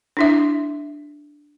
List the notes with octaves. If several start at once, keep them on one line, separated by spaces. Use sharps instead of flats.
D4 E4 E5